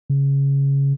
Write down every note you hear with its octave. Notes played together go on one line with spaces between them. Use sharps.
C#3